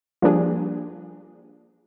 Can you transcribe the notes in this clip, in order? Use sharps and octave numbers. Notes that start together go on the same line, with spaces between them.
F3 G3 A#3 D4 G#4